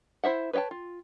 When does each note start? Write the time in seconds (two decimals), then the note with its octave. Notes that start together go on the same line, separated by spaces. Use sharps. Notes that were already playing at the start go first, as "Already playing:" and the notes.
0.24 E4 C5 E5 F#5
0.53 B4 C#5 D#5 G5 A5
0.71 F4